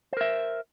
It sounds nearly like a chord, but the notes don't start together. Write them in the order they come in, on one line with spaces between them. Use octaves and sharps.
C5 A#4 E5